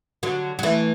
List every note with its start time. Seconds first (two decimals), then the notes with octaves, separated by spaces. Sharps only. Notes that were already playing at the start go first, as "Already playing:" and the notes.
0.23 D3 F#3
0.59 F#3
0.63 E3 A3